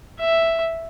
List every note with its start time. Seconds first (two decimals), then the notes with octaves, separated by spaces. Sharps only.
0.19 E5